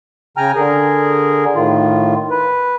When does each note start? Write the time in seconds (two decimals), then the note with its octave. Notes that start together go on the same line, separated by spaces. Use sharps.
0.37 C#3 G5 G#5 A#5 F6
0.56 D3 G#4 A#4
1.55 A2 D#3 F4
2.31 B4